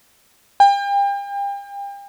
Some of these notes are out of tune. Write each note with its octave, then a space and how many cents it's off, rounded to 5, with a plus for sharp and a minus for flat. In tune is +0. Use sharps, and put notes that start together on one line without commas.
G5 +40